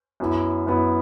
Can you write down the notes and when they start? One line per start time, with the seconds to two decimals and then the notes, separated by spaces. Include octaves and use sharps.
0.20 F#2 F#3 B3 E4
0.67 F#2 F#3 B3 E4